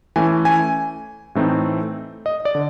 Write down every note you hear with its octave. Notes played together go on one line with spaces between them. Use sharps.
E3 A3 C#4 G#5
G#5
A2 E3 A3 C4 D#4
D#5
D5
D3